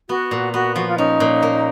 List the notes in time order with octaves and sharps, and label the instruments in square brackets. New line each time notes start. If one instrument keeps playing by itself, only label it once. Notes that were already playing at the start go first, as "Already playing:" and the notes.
[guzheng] B3 [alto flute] F#4
[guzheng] A#2
[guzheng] B3 [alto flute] F#4
[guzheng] F3 [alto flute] F#4
[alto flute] F4
[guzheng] C#4 [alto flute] D#4
[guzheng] A#2
A#3